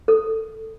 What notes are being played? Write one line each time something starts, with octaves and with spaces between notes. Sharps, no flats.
A4